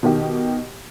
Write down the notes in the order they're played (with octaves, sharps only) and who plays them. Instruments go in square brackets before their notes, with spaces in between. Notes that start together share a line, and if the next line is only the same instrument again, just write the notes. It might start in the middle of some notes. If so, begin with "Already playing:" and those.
[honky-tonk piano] B2 D#3 G4